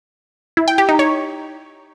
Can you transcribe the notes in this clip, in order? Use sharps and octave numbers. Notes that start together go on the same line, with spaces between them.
E4
G5
G4
D#4
C#5